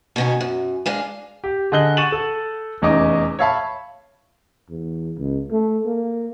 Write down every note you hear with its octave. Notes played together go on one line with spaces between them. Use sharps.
B2 D#3 C#4
F#2
G#3 D4 F5
G4
D3 G#4 D#5 F#6 G7
F#5 C#6 A6 D#7 E7 F#7
A4
F1 E2 C#4 D#4 D#5 D6
C#5 E5 F5 A5 B5
E2
C#2
A3
A#3